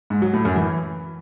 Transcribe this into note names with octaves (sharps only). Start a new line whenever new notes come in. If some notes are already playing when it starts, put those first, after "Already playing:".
G#2
F#3
A2
F#2
E3